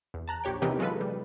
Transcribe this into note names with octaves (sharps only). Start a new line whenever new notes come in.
E2
A5 A#5 F#6
A#1 G4 C#5 G5
C3 E3 B3 D#4 G4 A#4
F#3 G#3 F4 A4 B4
G3